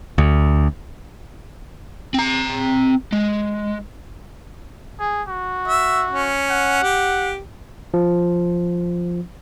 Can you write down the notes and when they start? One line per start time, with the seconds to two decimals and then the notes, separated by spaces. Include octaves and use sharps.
0.18 D2
2.14 C4 A#5
3.13 G#3
5.00 G#4
5.28 F#4
5.68 E5
6.10 C#4
6.50 F#5
6.83 G4
7.94 F3